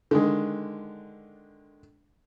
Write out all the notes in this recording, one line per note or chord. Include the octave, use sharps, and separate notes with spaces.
D3 D#3 G#3